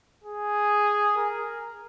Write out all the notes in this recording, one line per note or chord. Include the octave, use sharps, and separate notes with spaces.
G#4
A#4